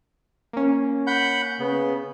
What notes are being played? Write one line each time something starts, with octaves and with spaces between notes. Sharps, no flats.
A#3 C#4
F#5 B5 G6
C#3 B3